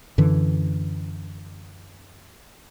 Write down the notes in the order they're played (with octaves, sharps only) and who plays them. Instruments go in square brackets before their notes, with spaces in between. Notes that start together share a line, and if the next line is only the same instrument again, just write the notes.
[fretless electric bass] F#2 D3 E3